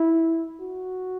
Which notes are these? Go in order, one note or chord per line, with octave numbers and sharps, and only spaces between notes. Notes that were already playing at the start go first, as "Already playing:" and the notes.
Already playing: E4
F#4